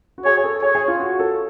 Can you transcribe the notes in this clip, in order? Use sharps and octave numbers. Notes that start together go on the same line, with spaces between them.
F#4
G#4 C#5
G#4
A4
G#4 C#5
G#4
F4
F#4
A4